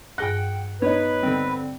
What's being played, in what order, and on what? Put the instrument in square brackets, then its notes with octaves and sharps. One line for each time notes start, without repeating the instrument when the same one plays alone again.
[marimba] G2 G#4 A#6 [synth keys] F#5 G5 [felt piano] F#6
[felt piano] B3 D#4 [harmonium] B4 [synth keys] C#5
[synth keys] D3 G3 C4